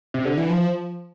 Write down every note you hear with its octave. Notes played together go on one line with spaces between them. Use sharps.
C3
D3
E3
F3